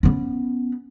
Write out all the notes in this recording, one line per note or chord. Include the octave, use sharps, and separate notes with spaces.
B3 C#4